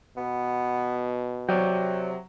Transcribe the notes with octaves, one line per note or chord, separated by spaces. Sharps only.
B2 B3
C3 F#3 C#5 D5 G5